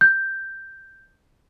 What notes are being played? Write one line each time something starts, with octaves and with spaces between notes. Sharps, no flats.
G6